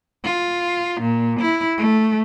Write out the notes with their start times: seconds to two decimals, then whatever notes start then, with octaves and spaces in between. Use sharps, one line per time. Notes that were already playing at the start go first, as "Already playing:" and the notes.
0.24 F4
1.01 A#2
1.40 E4
1.78 A3